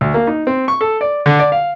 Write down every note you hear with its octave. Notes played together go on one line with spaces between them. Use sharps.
D2
A#3
D#4
C4
C#6
A4
D5
D3
D5
F5